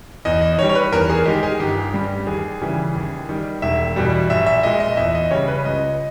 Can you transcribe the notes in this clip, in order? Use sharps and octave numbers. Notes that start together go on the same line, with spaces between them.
E2 D#5
D#5
D#3 G3 C#5
C#5
B4
E2 A#4
G#4
D#3 G#3 G4
G#4
G1 G4
G2 G3
D#2 G#4
C#3 E3 G3
D#2
D#3 G3
E1 E5
E2 B2 G3
A#1 E5
E5
A#2 G#3 D#5
D#5
E2 E5
D#5
C#3 G3 C#5
B4
C#2 D#5